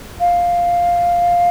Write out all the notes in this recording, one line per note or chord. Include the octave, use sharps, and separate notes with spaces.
F5